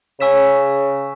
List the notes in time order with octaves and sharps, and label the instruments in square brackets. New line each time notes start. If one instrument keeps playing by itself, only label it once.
[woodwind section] C#3 [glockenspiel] G#5 C#6 E6 B6 E7